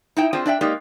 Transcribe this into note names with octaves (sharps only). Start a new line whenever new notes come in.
D#4 E4 G5
C4 D4 F4 G#4 C5 G5
D4 D5 E5 G5
G#3 A#3 D#4 G4 D5